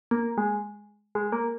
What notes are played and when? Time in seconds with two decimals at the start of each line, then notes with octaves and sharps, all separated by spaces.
0.11 A#3
0.38 G#3
1.15 G#3
1.32 A#3